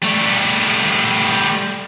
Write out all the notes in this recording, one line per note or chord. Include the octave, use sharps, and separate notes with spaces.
G3 A3